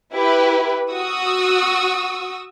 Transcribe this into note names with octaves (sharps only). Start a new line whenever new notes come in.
E4 G4 B4
F#4 C#6 D#6 E6